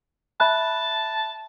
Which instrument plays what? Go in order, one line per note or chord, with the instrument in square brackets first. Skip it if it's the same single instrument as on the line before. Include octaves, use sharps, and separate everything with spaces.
[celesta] E5 B5 F#6 [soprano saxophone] A5